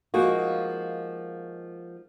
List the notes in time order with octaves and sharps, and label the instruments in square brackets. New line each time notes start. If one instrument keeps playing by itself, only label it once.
[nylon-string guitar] F3 G#3 A#3 D#4 F#4